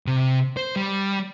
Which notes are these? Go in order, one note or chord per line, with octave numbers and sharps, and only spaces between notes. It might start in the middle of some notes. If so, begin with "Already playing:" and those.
C3
C5
G3